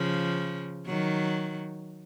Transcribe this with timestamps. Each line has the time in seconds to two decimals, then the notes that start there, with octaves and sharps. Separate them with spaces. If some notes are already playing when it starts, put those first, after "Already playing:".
Already playing: C#3 F3
0.87 D#3 F#3